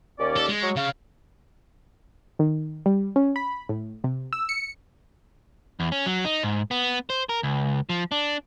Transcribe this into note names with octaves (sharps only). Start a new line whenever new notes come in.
D#2 C#4 D5
A4
G#3
F#3 C#6
C#3 F5
D#3
G3
C#4
B5
A2
C3
E6
C#7
E2
C#4
F#3
D#4
G#2
B3
C5
A#4
C#2
F3
D4